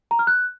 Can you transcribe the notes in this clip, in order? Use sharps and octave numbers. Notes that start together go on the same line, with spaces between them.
A#5
F6
F#6